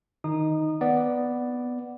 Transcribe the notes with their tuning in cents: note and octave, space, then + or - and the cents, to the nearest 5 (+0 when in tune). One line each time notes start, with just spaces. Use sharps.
D#3 +0 D#4 +0 D#6 -30
B3 +0 D5 +0